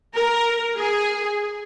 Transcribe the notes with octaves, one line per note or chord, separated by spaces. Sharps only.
A#4
G#4